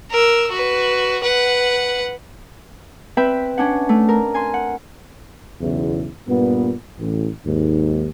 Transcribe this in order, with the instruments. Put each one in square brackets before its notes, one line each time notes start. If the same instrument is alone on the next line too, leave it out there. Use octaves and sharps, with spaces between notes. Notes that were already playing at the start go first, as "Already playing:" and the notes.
[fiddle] A#4 E6
F#4 B4
B4 F#5
[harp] C4 B4 E5 G5 B5
C#4 D4 F#5
A3
A#4
G#5 C6
F#5
[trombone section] B1 E2 C#3 E4
G2 A#2 B3
A1
D#2 G#2